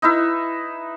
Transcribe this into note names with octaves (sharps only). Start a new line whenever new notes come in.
D#4 E4 B4 E5